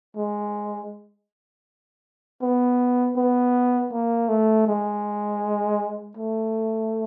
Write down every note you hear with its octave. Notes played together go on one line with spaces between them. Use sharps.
G#3
B3
B3
A#3
A3
G#3
A3